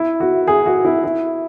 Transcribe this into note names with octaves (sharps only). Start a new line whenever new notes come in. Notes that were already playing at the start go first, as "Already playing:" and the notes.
Already playing: E4
F#4
G#4
F#4
E4
E4